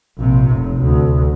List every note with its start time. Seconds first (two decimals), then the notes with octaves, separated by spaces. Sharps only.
0.18 A#1 C3
0.51 F1
0.82 D2